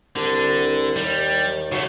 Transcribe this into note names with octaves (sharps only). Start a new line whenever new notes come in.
C2 D3
D#2 G3
C#3 F#3 A3